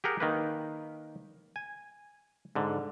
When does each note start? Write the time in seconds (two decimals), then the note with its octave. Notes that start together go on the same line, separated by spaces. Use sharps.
0.04 G4 G#4 A#4 F#5 G5
0.20 D#3 A#3 B4
1.56 G#5
2.55 G#2 D3